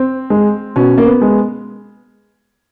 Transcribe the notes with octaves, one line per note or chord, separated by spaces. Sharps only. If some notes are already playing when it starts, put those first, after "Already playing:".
Already playing: C4
G#3
B2 C#4
A#3
B3
G#3